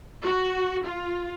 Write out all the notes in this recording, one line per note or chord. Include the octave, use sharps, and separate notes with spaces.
F#4
F4